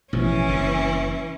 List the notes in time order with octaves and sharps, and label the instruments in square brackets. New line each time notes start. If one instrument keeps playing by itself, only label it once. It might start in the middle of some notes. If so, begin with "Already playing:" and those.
[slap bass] A1 B2 F3 [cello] E3 C#4
[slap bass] F#1 G2 C3